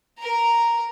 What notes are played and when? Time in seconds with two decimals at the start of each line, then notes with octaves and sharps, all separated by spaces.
0.18 A#4 A#5